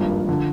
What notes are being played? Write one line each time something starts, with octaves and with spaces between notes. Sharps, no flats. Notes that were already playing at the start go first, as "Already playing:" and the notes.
Already playing: G#1 G2 F3 A#3 D4
D3 F3